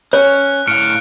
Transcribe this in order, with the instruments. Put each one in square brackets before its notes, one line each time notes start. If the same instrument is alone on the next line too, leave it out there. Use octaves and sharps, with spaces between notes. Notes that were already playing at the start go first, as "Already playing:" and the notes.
[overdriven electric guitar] C#4 [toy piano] C#5 [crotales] F#6
[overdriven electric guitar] A2 F5 [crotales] F6 C#7 D7